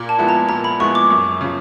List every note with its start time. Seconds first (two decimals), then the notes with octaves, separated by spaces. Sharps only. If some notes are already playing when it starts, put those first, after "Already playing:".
Already playing: A#2
0.09 A5
0.19 F3 G#3 B3 E4
0.29 A#5
0.49 A#2 A#5
0.64 B5
0.80 F3 G#3 B3 E4 C#6
0.95 D6
1.10 F#2
1.41 C#3 F3